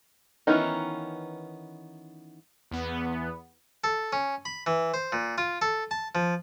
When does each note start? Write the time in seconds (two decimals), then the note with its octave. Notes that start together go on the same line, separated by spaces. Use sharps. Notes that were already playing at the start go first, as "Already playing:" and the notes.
0.47 D#3 E3 B3 C#4 D#4
2.71 E2 B3
3.84 A4
4.13 C#4
4.45 B5
4.66 E3
4.94 C5
5.12 A#2
5.38 F4
5.61 A4
5.91 A5
6.15 F3